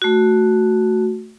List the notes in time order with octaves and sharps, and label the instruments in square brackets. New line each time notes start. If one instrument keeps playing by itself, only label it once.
[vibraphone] A3 F#4